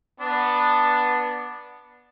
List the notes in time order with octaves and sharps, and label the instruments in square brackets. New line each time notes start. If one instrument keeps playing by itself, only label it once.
[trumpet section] B3 D4